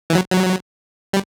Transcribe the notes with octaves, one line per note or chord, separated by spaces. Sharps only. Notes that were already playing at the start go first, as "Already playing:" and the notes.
E3
F#3
F#3
G3